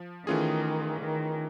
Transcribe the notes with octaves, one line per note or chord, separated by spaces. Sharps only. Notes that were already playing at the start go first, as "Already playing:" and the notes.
Already playing: F3
D#3 E3 A3 C#4 F4 G#4
D#3